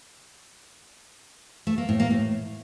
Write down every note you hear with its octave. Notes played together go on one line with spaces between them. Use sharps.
A3
A#3
A2
A#3
A2